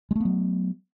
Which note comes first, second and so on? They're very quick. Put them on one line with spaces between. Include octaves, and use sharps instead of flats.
G#3 A3 B3 F#3